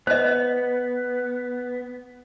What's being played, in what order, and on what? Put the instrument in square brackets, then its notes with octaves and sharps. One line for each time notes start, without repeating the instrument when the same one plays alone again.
[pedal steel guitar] B3 [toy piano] C5 D#5